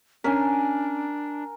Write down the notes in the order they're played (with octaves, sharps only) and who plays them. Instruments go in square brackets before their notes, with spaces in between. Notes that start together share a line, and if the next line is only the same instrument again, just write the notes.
[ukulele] C#4 [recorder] D4 [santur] A#4 G#5